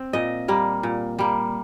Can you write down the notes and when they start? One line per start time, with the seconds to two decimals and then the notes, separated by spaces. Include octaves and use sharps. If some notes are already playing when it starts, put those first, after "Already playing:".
Already playing: C4
0.13 A#2 D#5
0.48 G3 A#3
0.83 A#2
1.19 G3 A#3